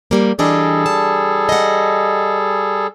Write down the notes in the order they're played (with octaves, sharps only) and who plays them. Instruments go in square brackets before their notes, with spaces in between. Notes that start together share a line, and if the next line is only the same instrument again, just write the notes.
[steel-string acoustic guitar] F3 G3 A#3
[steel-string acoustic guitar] E3 D4 D#5 [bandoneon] G3 G#4 A4
[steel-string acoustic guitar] A5
D#5 F#5